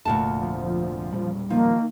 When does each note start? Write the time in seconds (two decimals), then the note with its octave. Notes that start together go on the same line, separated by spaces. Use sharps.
0.05 F1 D2 A#2 A5
0.41 F3
1.12 E1 A#2 G3
1.50 D#3 F3 A#3